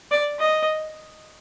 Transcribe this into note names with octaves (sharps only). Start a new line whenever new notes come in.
D5
D#5